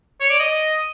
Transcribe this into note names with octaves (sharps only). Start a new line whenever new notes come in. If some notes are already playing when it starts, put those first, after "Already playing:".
C#5
D5
D#5